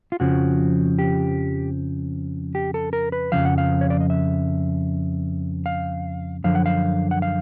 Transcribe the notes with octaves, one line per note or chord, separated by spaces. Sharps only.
F4
F2 C#3 F3 F#4
G4
G4
A4
A#4
B4
F2 C#3 F3 F5
F#5
F5
C#5
D5
D#5
E5
F5
F#2 D3 F3 F5
F#5
F5
F#5
F5